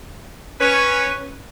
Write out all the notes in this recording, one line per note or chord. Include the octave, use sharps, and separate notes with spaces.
C#4 B4 C#5